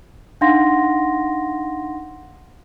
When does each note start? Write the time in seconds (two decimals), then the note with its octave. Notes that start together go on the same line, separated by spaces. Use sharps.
0.41 D4 D#4 F5 F#5 C6 A#6